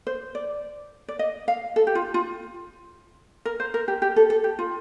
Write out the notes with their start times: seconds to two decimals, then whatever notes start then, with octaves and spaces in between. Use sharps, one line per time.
0.07 C5
0.35 D5
1.08 D5
1.19 D#5
1.48 F5
1.76 A4
1.87 G4
1.95 F4
2.14 F4
3.45 A#4
3.60 C5
3.74 A#4
3.88 G4
4.02 G4
4.16 A4
4.30 A4
4.44 G4
4.59 F4